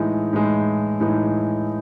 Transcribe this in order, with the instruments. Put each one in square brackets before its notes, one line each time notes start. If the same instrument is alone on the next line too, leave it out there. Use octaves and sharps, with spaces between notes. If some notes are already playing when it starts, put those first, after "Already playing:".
Already playing: [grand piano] A2 E3 G#3 D#4
A2 E3 G#3 D#4
A2 E3 G#3 D#4